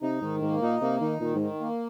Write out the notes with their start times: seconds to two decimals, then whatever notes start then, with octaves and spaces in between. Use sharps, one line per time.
0.02 C3 D#4
0.22 G#2 D#3
0.42 G#2 A#3
0.62 A#2 D#4
0.81 C3 A#3
1.01 D#3 D#4
1.20 A#2 D#3
1.35 G#2
1.41 D#3
1.61 A#3